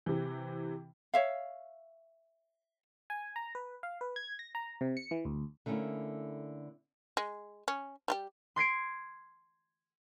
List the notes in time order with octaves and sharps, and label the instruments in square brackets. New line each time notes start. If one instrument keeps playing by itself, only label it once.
[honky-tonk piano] C3 E3
[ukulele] C#5 E5 F5
[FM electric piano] G#5
A#5
B4
F5
B4
G#6
A#6
A#5
C3
C#7
E3
D2
[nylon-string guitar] D3 A3 A#3 C#4 E4
[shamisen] G#3
C#4
G3 F4 G4
[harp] C6 G#6 C7 D7